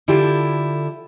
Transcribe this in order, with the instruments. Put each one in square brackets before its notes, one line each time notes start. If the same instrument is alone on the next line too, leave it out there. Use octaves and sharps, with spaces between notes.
[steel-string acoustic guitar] D3 E4 F4 G4 A4